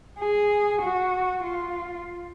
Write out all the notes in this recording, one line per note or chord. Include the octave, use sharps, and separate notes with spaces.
G#4
F#4
F4